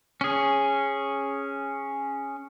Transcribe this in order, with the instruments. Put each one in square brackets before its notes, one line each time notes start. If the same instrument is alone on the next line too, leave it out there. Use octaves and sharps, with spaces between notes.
[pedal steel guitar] C#4 G#4